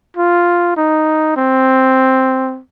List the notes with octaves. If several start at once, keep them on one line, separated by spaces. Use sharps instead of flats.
F4
D#4
C4